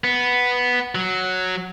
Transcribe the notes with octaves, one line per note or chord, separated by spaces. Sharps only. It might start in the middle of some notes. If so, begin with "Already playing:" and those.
B3
F#3